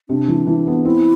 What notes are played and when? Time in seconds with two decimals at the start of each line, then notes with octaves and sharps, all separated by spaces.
0.09 C3 D4
0.28 E3
0.47 E3
0.67 B3
0.85 C4 E4